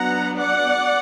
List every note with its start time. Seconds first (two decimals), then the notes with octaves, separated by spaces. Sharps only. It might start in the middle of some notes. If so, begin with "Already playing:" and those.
Already playing: F#3 B3 D4 F#5 A#5
0.37 D5 F#5